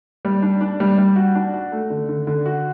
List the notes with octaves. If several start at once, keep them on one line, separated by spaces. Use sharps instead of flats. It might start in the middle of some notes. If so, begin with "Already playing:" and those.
G3
D4
D4
G3
G3
F#4
D4
F#4
A3
D3
D3
D3
F#4